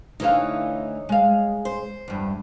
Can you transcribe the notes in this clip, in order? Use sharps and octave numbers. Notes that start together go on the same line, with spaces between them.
D2 E3 D#4 C#5 F5
G#3 F5
C5
E2 G2